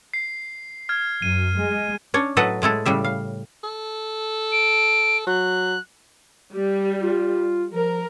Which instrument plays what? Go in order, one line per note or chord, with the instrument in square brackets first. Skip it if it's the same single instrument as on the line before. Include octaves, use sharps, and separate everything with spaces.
[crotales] C7
F6 G#6
[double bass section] F#2 [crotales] D#7
[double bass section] G#3
[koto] C#4 D4 C#5
A2 F#3 A4 B4 D#5 F#5
A2 G#3 E4 A4
A2 C#3 G3 E5
F5
[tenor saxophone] A4
[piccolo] D7
[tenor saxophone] F#3 [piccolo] F#6
[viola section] G3
[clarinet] F4
[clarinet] F3 [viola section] A#4